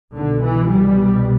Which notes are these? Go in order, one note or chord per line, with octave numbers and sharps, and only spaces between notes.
C2 B2 D3
E3
G3